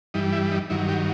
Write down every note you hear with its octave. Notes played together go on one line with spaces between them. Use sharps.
G2 E3 G3 D#4
E4
D#4
G2 D#3 F#3 E4
G4